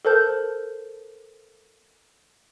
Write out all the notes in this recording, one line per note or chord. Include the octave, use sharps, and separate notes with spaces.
A4 A#4 C5 A5 G6